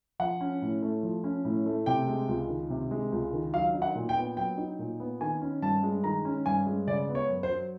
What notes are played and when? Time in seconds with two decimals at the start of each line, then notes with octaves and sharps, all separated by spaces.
0.20 F3 F#5
0.41 C#4
0.62 A2
0.82 A3
1.03 F3
1.24 C#4
1.45 A2
1.66 A3
1.86 C3 G5
2.08 G#3
2.29 C#2
2.49 D#3
2.70 C3
2.91 G#3
3.12 C#2
3.33 D#3
3.54 F#3 F5
3.75 D#4
3.82 F#5
3.95 A#2
4.09 G5
4.17 B3
4.37 F#3 G5
4.58 D#4
4.79 A#2
5.00 B3
5.21 D#3 G#5
5.41 C#4
5.62 G2 A5
5.83 G#3
6.04 D#3 A#5
6.25 C#4
6.46 G2 G#5
6.66 G#3
6.87 C#3 D5
7.09 B3
7.15 C#5
7.29 F#2
7.43 C5
7.50 F#3